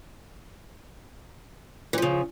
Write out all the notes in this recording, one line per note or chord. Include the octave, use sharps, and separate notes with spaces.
C#3 E3 F3